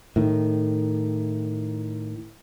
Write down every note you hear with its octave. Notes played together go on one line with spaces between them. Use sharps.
A2 D#3